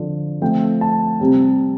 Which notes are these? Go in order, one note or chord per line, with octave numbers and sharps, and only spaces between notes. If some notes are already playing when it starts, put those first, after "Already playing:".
Already playing: D3 F3 D4
F3 A3 C4 G5
A5
C3 G3 C4